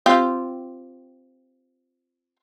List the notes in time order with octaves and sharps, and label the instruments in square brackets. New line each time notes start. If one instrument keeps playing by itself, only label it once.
[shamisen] C4 F4 G4